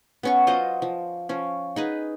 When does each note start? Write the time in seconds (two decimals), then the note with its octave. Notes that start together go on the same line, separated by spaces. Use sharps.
0.23 B3 C#4 C#6
0.47 F#3 F4 C5 D#5
0.82 F3
1.29 F3 C#4
1.76 D#4 G#4 B4